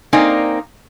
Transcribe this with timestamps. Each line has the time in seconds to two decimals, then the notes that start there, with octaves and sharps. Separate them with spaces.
0.13 A#3 C4 D#4 D5 G#5